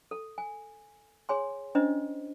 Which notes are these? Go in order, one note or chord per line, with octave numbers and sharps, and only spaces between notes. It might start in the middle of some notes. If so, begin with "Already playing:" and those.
A4
G#5
G#4 C#5 G#5 C6
C#4 D4 E4 C5 D#5